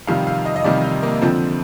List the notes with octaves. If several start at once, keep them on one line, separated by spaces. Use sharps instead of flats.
F2 C3 D#3 G3 F5
F5
D#5
D#5
F2 C3 D#3 G3 D5
D#4
A#3
F2 D3 F3 C4